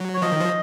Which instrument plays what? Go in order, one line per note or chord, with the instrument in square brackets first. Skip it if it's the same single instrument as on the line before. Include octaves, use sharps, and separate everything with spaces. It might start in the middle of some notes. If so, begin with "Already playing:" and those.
Already playing: [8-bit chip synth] F#3
[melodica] C#5
[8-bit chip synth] F3 [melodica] D#5
[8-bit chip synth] D#3
F3